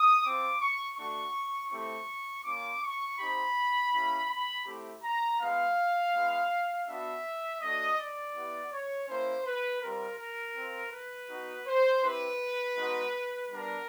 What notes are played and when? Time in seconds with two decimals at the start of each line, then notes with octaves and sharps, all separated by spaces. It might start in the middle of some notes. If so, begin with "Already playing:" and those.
Already playing: D#6
0.24 C4 F4 D6
0.61 C#6
0.98 A3 D4 F#4 C#6
1.71 A3 C4 E4 G4 C#6
2.44 A#3 C#4 F4 D6
2.82 C#6
3.19 C4 D#4 G4 B5
3.93 A#3 C#4 E4 G4
4.30 B5
4.66 A3 C4 E4 G4
5.03 A#5
5.39 G#3 B3 E4 F5
6.14 G#3 B3 E4
6.87 B3 D4 F#4 E5
7.61 A3 D4 F#4 D#5
7.97 D5
8.35 B3 E4 G4
8.72 C#5
9.08 A#3 C#4 E4 C5
9.46 B4
9.82 G3 C4 F4 A#4
10.19 A#4
10.55 C4 F4
10.93 B4
11.29 B3 D#4 F#4
11.67 C5
12.03 C4 E4 G4 B4
12.77 G#3 B3 D#4 F#4
13.50 G3 B3 D4 A#4